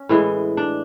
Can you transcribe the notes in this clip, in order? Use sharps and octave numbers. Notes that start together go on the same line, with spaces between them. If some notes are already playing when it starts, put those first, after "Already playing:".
Already playing: C#4
A2 E3 G#3
D4